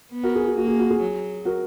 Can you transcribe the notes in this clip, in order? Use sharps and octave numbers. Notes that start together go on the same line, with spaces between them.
B3
F#4 A#4
G#4
F#4
A#3 F#4
G#4
F#4
G#4
F#3
F#4 A#4